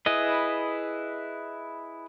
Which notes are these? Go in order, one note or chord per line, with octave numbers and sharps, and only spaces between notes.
E4 G#4 B4 D#5